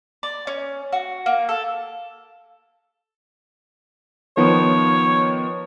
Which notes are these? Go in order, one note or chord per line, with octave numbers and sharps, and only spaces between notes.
D5
C#4
F#4
A#3
A4
D#3 F3 B3 C#5